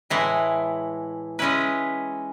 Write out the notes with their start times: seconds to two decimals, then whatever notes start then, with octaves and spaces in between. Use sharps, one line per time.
0.10 A2 E3 G#3
1.39 G#3 C#4 E4 B4